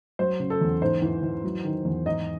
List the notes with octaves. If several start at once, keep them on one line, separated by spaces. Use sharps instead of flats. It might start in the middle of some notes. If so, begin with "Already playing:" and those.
F#3 C5
C#3
A4
E2
G#2 C5
E3
E3
F#3
D#3
E2
G#2 D#4 D#5